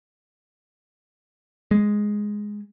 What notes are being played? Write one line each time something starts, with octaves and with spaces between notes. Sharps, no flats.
G#3